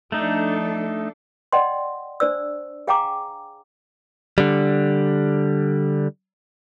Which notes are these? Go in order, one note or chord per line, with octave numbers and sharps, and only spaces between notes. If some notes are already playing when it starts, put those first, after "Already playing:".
F3 A3 D4 D#4 A4
D5 D#5 F#5 G5 C6
D4 C5 D5 E6
G#4 F5 G5 G#5 A#5 D6
D3 G3